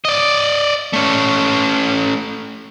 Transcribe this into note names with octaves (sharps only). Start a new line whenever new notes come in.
D5 D#5
A3 C#4